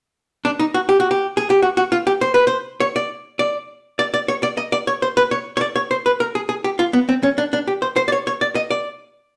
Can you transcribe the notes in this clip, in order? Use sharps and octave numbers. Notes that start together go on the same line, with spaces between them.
D4
D#4
F#4
G4
F#4
G4
G#4
G4
F#4
F#4
F4
G4
C5
B4
C5
C#5
D5
D5
D5
D5
C#5
D5
D#5
D5
C#5
C5
B4
C#5
C#5
D5
C#5
C5
B4
A#4
G#4
G#4
G4
F4
B3
C4
C#4
D4
D4
G4
C5
C5
D5
C#5
C#5
D5
D#5
D5